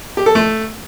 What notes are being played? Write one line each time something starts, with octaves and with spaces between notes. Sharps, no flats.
G4
A4
A3